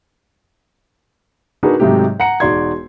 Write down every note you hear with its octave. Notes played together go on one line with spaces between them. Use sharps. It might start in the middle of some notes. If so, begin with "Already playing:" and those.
D4 D#4 F#4 G#4 A#4 B4
G#2 C3 F#3 A3 D#4 G4
F#5 A#5 C#7
E1 D#4 F#4 D5 C6 G#6